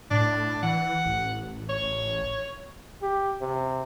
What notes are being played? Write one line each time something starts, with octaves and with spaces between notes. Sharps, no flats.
A2 D4
E3 F#5
A1
C#5
G4
C3